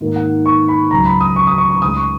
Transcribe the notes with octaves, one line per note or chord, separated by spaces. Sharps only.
G#2 D#3 A#3
F#5
C#6
B5
C#2 C#3 F#3 A#5
B5
D#6
C#6
D#6
C#6
C#6
C#2 C#3 G#3 D#6
C#6